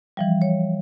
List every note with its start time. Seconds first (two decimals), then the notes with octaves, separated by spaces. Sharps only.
0.17 E3 F3 G3
0.42 C#5